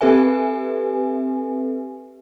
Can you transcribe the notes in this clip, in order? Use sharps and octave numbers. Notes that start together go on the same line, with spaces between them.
C4 G4 A4 B4 E5 G#5